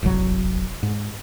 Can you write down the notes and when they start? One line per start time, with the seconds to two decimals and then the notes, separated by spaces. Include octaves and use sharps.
0.03 D1 G1 C2 F#3
0.83 G#2